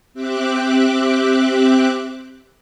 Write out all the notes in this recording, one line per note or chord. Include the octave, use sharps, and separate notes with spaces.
C4 G4 E5 D6 F#6